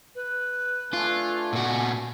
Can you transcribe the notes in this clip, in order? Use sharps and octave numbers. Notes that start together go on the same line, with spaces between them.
B4
A3 D4 F4 G#5
A#2 F#4